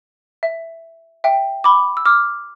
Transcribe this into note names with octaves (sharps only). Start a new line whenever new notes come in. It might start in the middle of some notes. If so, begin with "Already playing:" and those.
E5
E5 G5
B5 D6
E6
D6 F6